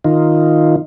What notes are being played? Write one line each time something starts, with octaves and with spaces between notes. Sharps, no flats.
D#3 D#4 F4